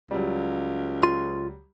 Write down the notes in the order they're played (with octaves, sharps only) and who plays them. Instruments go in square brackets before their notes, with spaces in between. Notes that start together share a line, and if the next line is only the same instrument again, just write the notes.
[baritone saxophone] C#2 [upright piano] F#3 G3
[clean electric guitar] F4 C6